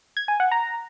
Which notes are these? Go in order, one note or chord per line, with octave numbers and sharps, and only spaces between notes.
G#6
G#5
F#5
A#5